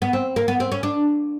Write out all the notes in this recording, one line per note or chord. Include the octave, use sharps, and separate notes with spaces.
B3
C4
A#3
B3
C4
C#4
D4